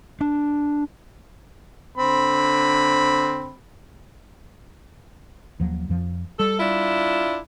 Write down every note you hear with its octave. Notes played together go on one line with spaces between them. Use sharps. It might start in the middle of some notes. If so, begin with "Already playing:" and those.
D4
D3 C4 B5
D#2 F3 F#3
F2 F3
G3 A4
D4 E4 F4